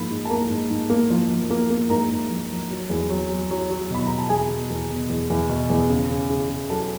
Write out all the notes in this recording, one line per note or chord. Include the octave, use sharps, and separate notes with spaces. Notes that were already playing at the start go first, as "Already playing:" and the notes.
Already playing: G#2 F3 A#3 B5
G#2
A5
A#3 A#4 A#5
G#2
G#2
A#3
F3
F3
A#3
A#3
G#2 A#4 A#5
G#2
F3
F3
F#3
E2
F#3
F#3
F#3
F#3
B2 B5
B2 A#5
A5
E2 G#4 G#5
B2
E2
B2
E2
E2
B2
E2
C#3
C#3
C#3
C#3
F#3 A4 A5